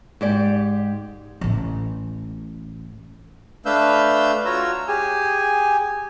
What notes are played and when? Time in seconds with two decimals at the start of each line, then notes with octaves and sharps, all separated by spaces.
0.21 G#2 G4 D5
1.41 A1 A2
3.66 A3 D4 B4 F5 E6 G6
4.45 F4 F#4 C#5 A#5 E6
4.88 G4 G#4 G#5